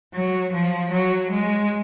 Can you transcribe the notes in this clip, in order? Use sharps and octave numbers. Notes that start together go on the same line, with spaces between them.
F#3
F3
F#3
G#3